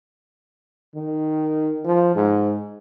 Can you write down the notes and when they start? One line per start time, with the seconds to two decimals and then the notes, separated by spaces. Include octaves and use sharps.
0.95 D#3
1.85 F3
2.16 G#2